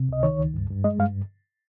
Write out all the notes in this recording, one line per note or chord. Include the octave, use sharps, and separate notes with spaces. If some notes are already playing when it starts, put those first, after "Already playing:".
Already playing: C3
C#2 D#5
D#3 C#5
C#2
G2
G2
G#3 D#5
G2 F5